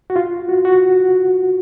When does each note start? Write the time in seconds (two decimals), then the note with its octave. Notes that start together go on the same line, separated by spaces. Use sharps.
0.10 F#4
0.16 F4
0.49 F#4
0.65 F#4